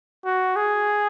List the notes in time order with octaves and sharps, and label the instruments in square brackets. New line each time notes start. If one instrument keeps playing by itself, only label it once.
[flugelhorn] F#4
G#4